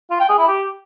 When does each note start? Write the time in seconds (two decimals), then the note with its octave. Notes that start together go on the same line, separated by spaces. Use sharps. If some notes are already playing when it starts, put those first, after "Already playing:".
0.11 F4
0.20 G5
0.29 G#4
0.38 E4
0.47 G4